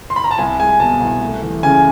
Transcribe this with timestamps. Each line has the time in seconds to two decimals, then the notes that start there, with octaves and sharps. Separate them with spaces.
0.10 C6
0.16 B5
0.24 A#5
0.31 A5
0.38 C2 G#5
0.59 G#3 G#5
0.80 B2 A5
1.01 C2
1.22 A3
1.42 E3
1.63 C#3 G#5